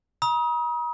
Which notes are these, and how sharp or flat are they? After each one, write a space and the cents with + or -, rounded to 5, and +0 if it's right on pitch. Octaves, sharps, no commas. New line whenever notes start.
A#5 +45 D#6 +25